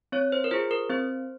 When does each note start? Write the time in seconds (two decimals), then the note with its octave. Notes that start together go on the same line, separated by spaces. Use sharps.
0.12 C4 C#5
0.32 C5
0.44 A#4
0.51 F4 G#4 C5
0.71 A#4
0.89 C4 C5